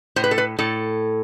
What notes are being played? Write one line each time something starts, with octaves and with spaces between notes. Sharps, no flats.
A2 C5
B4
A4
B4
A2 A4